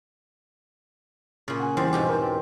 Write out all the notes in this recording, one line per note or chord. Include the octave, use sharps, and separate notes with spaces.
A#2 C#3
F#5 G#5
E2 G3 C4 C5
G#2 B2 G4
A#4 G5